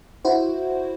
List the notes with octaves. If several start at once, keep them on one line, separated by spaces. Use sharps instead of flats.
E4 F#4 C5